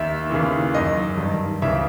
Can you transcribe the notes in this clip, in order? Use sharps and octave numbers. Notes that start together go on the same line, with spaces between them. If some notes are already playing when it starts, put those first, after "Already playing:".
Already playing: D#2 D#3 E5
D#2 C#3 E3
F#2 D#3 D#5
G2 D#3
C#2 C#3 E3 E5